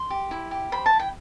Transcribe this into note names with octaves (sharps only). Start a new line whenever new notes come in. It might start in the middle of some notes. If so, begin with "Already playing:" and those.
Already playing: C6
G4
E4
G4
C5 B5
A5
E4
G5